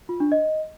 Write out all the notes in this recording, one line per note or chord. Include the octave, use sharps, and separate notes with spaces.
F4
D4
D#5